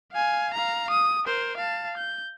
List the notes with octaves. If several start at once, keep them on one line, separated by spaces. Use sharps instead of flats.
F5 G#5
F5 A#5
D#6
A#4 C5
F5 A5
G6